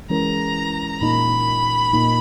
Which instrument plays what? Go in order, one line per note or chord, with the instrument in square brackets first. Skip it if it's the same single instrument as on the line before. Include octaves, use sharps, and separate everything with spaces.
[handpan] E3 G#3 C#4 E4 A#4 [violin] A#5
[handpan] A#2 A#3 D#4 [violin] B5
[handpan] A#2 A#3 D#4